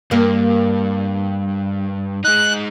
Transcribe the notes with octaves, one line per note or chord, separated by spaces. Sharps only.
G2 G3 A#3
G#3 D#4 F#6